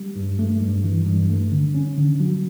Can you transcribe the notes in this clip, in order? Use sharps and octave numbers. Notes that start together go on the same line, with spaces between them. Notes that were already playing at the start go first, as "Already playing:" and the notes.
Already playing: G3
G2
A3
G2
E3
G2
A3
D3
C#4
D3
F#3